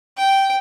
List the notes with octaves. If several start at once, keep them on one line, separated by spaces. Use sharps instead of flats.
G5